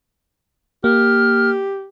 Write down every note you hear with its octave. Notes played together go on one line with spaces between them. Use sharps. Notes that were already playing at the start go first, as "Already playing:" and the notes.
A#3 G4 F6